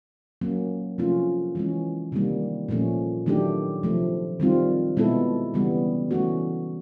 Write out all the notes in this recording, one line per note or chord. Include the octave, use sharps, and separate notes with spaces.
F#3 A#3 C#4
C3 F3 A3 C#4 F4
E3 G#3 C#4
C3 D#3 G3 A#3
A#2 F3 A3 C#4
D#3 F#3 A3 D4 G4
C3 F3 A3
D#3 G3 C4 F4
B2 G#3 B3 E4 A4
C#3 E3 G3 B3
E3 A3 C#4 F#4